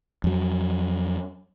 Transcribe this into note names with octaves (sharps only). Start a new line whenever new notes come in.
F2 F#3